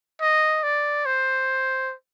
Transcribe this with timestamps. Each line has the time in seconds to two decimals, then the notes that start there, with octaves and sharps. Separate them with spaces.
0.21 D#5
0.63 D5
1.06 C5